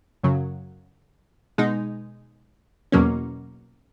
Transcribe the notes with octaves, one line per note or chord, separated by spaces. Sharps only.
F#2 C#3 F#3
B2 G#3 D#4
E2 B2 F#3 A#3 C#4